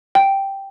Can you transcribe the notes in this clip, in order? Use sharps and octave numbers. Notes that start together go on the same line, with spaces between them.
G5